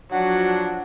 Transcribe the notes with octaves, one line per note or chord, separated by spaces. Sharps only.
F3 F#3 D4 F#4 F#5